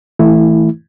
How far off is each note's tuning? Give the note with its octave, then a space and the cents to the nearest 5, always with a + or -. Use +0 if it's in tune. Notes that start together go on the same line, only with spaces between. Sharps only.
E3 -35 A3 +0 E4 +0